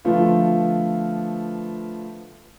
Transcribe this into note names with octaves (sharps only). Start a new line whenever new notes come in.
D3 F3 A3 B3 F4